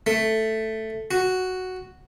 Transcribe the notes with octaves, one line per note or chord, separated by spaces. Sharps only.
A3
F#4